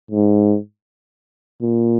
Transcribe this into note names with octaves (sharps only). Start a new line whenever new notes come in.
G#2
A#2